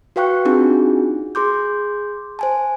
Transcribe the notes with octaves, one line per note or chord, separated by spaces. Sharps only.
F#4 B4 F5 G5 C#6 F#6
C4 D4 D#4 F4 F#4 G#4
G#4 C6 D6 G6
C5 G#5 A5